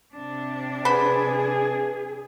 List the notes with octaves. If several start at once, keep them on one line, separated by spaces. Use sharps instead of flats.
C3 D4
G#4 B4 C5 F#5 B5